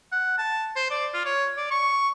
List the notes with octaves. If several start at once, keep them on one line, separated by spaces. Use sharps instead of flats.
F#5
A5
C5
D5
F4
C#5
D5
C#6